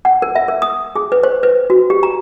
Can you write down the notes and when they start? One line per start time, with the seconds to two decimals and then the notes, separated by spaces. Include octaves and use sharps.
0.05 F#5
0.22 A#4
0.35 E5
0.48 A#4
0.62 D#6
0.95 G#4
1.12 B4
1.23 C5
1.43 B4
1.70 F#4
1.90 G4
2.03 A#5